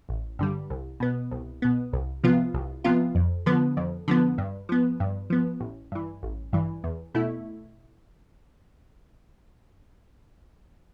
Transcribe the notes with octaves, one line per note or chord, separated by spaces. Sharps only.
A1
G2 D3 G3
C2
B2 B3
C2
B2 B3
C2
C3 F3 B3 F4
C2
C3 F3 B3 F4
F2
D3 F3 B3
F2
D3 F3 B3
G2
F3 B3
G2
F3 B3
A1
G2 E3
A1
G2 E3
E2
B2 A3 E4